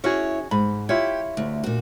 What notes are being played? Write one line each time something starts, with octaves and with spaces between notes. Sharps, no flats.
C#4 E4 F#4 G#4 C#5
G#2 B5
E4 F4 G4 C#5
D2
A#2 F#4